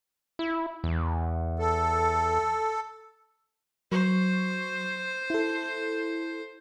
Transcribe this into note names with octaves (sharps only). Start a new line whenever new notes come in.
E4
E2
A4
F#3 C5 C#6
E4 A4